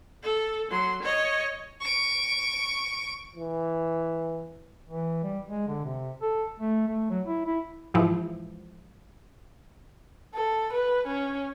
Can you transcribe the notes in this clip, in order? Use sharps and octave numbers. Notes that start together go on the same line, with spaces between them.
A4
F#3 C6
C#5 D#5
C#6 D7
E3
E3
G3
G#3
D3
C3
A4
A3
A3
F#3
E4
E4
G#2 E3 F3 E4
A4
B4
C#4